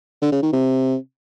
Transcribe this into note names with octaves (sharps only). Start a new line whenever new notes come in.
D3
C#3
D#3
C3